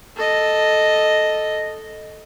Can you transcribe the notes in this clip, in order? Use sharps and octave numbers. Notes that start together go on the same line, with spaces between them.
A4 D#5